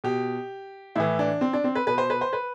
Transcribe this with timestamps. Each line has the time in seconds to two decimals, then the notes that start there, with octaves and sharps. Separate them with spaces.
0.04 B2 G4
0.96 A2 E3 E4
1.19 D4
1.41 C4
1.53 D4
1.64 C4
1.75 B4
1.87 B2 B4
1.98 C5
2.10 B4
2.21 C5
2.33 B4